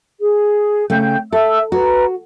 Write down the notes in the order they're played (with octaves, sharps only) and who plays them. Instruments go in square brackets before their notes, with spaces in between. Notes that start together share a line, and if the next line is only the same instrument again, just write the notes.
[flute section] G#4
[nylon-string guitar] C#3 A3 [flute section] G5 G6
[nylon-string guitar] A4 [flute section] E5 E6
[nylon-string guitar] F#4 [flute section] B4 A#5